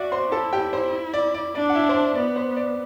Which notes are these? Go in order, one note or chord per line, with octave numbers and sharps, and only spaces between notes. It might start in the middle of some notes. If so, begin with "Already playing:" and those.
Already playing: F#4 D5 E5 D6
C5 C6
E4 A4 A5
G4 G5
C5
D5
D5
D4 D5
F#5
E4 E5
C5
D5
B3 D5
C5
D5